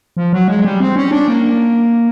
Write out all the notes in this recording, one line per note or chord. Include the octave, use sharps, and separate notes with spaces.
F3
F#3
G#3
G3
C4
C#4
D4
A#3